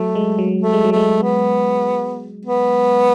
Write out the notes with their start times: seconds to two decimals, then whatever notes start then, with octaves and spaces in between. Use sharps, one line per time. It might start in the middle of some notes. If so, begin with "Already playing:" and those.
Already playing: F#3 A3
0.15 G#3
0.39 F#3
0.62 A3
0.73 G#3
0.85 F#3
0.92 G#3 A3
1.23 B3
2.45 B3